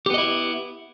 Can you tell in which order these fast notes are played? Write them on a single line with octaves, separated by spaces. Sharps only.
G4 B3 D#5 E4